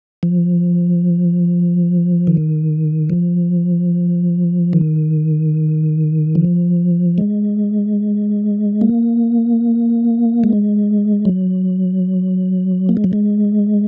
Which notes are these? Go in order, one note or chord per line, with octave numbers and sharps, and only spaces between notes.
F3
D#3
F3
D#3
F3
G#3
A#3
G#3
F#3
A#3
G#3
F#3
G#3